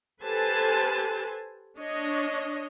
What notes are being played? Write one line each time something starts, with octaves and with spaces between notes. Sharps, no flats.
G4 A4 B4 C5 G#5 A5
D4 C#5 D#5